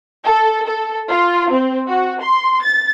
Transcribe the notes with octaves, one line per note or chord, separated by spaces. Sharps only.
A4
A4
F4
C4
F#4
C6
A6